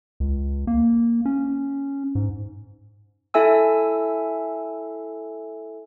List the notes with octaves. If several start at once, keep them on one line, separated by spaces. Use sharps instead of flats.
C#2
A#3
C#4
G#2
E4 A4 E5 G#5 E6